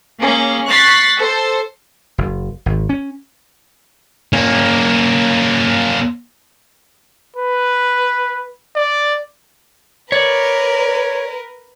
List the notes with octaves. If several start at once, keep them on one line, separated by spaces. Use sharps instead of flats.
A#3 C#4 G#4
C#6 F#6 A6 B6 C7
A4 C5
F#1
G#1
C#4
A#3 C#4
B4
D5
A#4 B4 C#5 D5